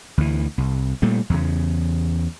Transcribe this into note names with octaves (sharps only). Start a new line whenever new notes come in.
D2 E3
C2
A#2 G3 A3
E2 C#3